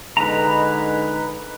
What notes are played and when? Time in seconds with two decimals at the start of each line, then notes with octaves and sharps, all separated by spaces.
0.17 D3 G#3 D#4 B4 A#5